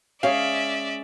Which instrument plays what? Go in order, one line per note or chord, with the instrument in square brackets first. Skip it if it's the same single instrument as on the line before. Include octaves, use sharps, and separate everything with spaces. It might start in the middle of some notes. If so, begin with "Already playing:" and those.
[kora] G#3 C#4 G#4 [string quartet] D5 E5 [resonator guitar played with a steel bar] F5